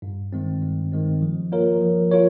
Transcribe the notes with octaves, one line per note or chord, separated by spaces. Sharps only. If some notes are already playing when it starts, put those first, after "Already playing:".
G2
D#3 G#3 C4
G2
D#3 G#3 C4
F3
A#3 F4 A#4 C#5
F3
F4 A#4 C#5